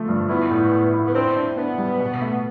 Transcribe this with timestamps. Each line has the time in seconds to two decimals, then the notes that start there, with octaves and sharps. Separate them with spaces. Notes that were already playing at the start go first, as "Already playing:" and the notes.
Already playing: F3 A3
0.09 G2
0.29 B3 E4
0.51 A2
0.72 A2
0.94 E4
1.08 B3
1.14 C4 D4
1.36 D4
1.57 B3 D4
1.78 G3
2.00 B2
2.21 A3